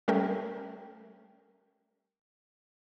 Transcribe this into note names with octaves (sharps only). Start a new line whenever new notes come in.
G3 A3 C#4 A4 A#4 G5